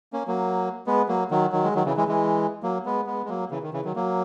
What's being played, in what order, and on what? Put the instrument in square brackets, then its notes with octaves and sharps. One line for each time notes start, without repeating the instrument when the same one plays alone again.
[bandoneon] A#3 C#4
F#3 A#3
G#3 B3
F#3 A#3
D#3 F#3
D#3 F#3
G#3
D#3 F#3
C#3 E3
E3 G#3
E3 G#3
F#3 A#3
G#3 B3
G#3 B3
G#3
F#3 A#3
C#3 E3
D#3
C#3 E3
D#3 F#3
F#3 A#3